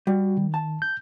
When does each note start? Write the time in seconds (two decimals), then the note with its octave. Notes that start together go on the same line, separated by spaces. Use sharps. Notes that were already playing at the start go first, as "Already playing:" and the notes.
0.07 G3 F#4
0.37 D#3
0.54 A5
0.82 G6